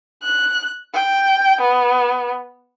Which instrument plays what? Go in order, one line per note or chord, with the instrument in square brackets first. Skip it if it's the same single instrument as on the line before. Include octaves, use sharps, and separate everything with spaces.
[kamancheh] F#6
G5
B3